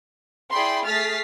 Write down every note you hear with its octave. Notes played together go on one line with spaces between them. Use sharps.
E4 G#4 D5 G5 B5 C6
A3 G#4 F6 A6 B6 C7